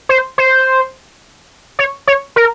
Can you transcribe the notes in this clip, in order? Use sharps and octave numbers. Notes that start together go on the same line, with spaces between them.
C5
C5
C#5
C#5
A#4